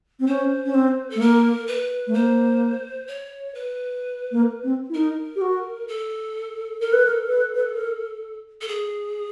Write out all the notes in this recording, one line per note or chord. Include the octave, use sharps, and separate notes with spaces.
C4
C#4 C5
C#4
C4
A4
A3
A#3 A#4
B4
A3
A#3 C5
C#5
B4
A#3
C4
E4
D#4 A#4
G4
F#4
A4
A4 A#4
B4
A#4
B4
B4
A#4
A4
G#4